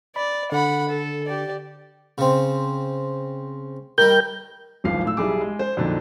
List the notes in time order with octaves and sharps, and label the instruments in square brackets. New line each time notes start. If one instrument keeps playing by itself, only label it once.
[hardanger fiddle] D5 [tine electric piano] B5
[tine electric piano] D3 [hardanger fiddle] F#5 B5
[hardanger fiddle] A4
G4 D5
[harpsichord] C#3 C4
[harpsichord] D#3 G3 [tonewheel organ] A#4 G5 G6
[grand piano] D1 G#1 F3 F5 C7
A2 E6
B1 G3 E4 G#4 D6
G#3
C5
F2 A#2 D3 F#3 D4 D#4